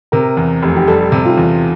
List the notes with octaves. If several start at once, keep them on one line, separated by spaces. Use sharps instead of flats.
C3 A#4
E2
F1
G4
G3 A4
C3
F4
E2